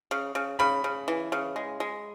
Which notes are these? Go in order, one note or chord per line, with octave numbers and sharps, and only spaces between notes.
C#3
C#3
C#3 B5
C#3
E3
C#3
G#3
G#3